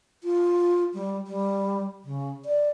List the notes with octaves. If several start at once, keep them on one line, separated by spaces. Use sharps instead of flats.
F4
G3
G3
C#3
D5